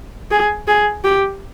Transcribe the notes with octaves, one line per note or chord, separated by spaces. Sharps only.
G#4
G#4
G4